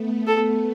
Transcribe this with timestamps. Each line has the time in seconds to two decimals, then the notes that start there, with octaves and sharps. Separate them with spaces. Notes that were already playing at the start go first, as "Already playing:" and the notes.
Already playing: A3 B3
0.27 A4